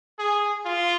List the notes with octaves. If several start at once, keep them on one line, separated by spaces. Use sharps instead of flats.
G#4
F4